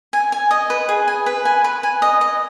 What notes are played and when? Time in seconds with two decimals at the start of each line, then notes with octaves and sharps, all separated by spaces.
0.13 G#5
0.32 G#5
0.51 D#5
0.70 B4
0.89 G#4
1.08 G#5
1.26 B4
1.45 G#5
1.64 B4
1.83 G#5
2.02 D#5
2.21 D#5